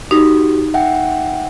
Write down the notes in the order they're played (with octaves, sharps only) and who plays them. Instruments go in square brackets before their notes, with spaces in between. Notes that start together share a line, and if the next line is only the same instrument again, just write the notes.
[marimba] D#4 [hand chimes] F#4 G4
[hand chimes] E5 F#5 G5